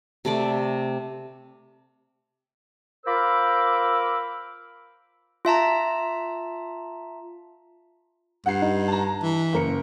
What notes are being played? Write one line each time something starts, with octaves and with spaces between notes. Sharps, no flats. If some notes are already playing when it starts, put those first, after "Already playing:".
C3 A3 D5
F4 A#4 C5 B5 D6 E6
F4 E5 A5 A#5
G2 F#5 C7
D#4
A5 A#5
E3
F#1 A#4 C#7